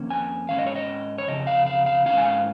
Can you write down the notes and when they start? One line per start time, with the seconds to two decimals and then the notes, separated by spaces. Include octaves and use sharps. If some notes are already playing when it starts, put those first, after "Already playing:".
Already playing: F2 D#3 A#3 C#4
0.10 G#5
0.49 G#2 D#3 C#4 F5
0.59 D#5
0.67 C#5
0.76 D#5
1.18 C#5
1.28 F2 C#3 D#5
1.47 F5
1.66 F5
1.86 F5
2.06 G#2 D#3 C#4 F5
2.18 G#5
2.25 F5